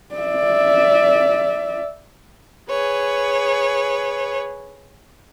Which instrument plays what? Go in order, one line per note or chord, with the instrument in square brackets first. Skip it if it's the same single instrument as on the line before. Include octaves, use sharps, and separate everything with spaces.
[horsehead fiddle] D5 E5
[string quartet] G#4 B4 C#5